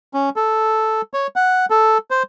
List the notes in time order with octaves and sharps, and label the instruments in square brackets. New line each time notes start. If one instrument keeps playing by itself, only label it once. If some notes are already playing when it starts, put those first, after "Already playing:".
[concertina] C#4
A4
C#5
F#5
A4
C5